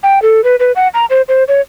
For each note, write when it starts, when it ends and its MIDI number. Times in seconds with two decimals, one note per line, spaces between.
0.03 0.22 79
0.22 0.43 69
0.44 0.56 71
0.60 0.72 71
0.76 0.88 78
0.94 1.05 82
1.10 1.22 72
1.29 1.44 72
1.48 1.61 73